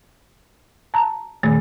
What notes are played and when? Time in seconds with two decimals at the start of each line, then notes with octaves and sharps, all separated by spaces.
0.94 A5 A#5
1.43 A#2 D#3 A3